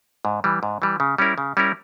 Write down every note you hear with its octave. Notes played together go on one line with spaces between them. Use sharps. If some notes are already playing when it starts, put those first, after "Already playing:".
G#2
E3 G3
G#2
E3 G3
C#3
G3 C#4 E4 A#4
C#3
G3 C#4 E4 A#4